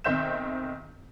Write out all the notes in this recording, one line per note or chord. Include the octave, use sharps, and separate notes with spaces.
B1 D#3 C4 E5 G6 E7